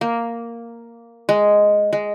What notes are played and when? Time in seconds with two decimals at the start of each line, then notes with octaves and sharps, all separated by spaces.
0.01 A#3
1.29 G#3
1.93 G#3